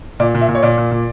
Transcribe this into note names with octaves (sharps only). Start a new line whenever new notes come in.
A#2 D5
A#2
E5
A#2
C#5
A#2 D5
A#2
A#2